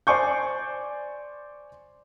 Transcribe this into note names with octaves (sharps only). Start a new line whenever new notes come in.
C5 D5 G#5 C#6 G6